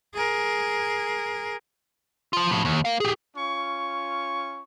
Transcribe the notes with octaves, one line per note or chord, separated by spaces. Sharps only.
G#4 A#4
F3 F4
A2 F3
D#2
A#4 F5
G4 G#4
C#4 F4 C#6